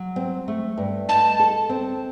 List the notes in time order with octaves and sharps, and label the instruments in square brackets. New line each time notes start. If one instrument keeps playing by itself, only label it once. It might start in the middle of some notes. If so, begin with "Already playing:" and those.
Already playing: [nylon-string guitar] F#3
C4
A3
G2
[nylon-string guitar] D#4 [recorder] A5
[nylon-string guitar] A4
C4